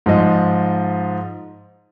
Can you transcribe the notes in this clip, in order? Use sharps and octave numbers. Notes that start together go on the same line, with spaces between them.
G#2 F3 D#5